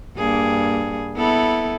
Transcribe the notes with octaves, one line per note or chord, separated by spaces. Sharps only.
G2 A#3 G#4
B3 E4 A4